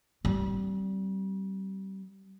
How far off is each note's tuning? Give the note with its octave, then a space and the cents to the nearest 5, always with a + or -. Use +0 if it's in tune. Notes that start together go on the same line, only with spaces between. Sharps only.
G3 -30 C4 +0